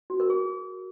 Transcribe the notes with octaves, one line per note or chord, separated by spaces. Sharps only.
F#4
A#4
G#4